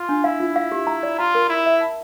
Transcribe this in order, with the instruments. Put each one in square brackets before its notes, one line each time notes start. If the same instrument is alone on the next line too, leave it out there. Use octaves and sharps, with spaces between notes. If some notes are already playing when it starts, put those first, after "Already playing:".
Already playing: [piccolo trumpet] F4
[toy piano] D4
[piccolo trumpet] E4 [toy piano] F5
[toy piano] F4
F5
G4
A#5
D5
[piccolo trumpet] F4 [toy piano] A#5
[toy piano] A#4
[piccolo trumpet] E4 [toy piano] A#4
[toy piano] E5
A5